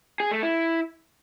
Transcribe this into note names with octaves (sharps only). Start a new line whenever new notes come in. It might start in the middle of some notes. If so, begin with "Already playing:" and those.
G#4
A3
E4